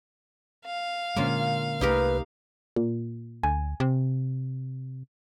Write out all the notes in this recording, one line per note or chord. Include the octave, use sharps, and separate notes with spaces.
F5
A#2 D3 G#3 A#3 C#4 F4
C2 A3 D#4 G4 A#4 B4
A#2
D2 G#5
C3